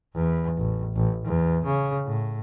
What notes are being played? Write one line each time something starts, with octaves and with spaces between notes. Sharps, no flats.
E2
A1
A1
E2
C#3
A2